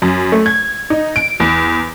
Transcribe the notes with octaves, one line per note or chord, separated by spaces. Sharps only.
F#2
A3
G#6
D#4
D7
E2